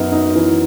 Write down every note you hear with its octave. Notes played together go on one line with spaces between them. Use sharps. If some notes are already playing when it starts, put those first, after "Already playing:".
Already playing: F#2 B3 D#4
D#4
E3